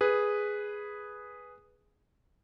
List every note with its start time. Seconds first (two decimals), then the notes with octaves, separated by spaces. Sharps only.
0.01 G#4 B4